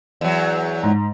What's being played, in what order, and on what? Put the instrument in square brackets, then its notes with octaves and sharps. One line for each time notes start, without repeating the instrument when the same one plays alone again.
[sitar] E2 F#3
[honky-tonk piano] G#2